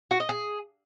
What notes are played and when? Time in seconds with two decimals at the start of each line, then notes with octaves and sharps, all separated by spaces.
0.11 F#4
0.20 D#5
0.29 G#4